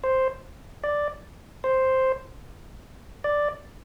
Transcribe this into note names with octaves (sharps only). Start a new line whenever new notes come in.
C5
D5
C5
D5